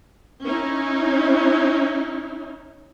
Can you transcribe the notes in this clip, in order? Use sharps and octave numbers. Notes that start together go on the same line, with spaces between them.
C#4 D#4 E4